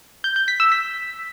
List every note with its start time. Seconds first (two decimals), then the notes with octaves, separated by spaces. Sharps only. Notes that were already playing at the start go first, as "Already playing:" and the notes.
0.24 G6
0.36 G6
0.48 B6
0.60 E6
0.72 B6